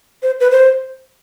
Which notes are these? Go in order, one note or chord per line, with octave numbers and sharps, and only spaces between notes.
C5
B4
C5